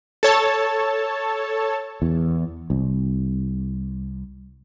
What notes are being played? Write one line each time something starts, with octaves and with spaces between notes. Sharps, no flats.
A4 C#5 A5
E2
C2